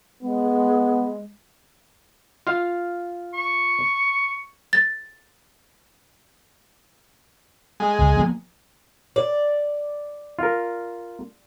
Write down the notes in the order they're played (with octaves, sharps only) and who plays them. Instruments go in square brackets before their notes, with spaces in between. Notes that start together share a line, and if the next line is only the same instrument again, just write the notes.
[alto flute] G#3 [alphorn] B3
[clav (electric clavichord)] F4 F5
[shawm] C#6
[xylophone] A6
[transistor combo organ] G#3
[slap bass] C#2
F3 A#3 B3
[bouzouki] D5
[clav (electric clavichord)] F4 A#4